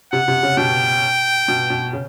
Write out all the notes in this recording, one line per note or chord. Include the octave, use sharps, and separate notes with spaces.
C3 F#5
C3
C#3
B2 G5
B2
B2
C#3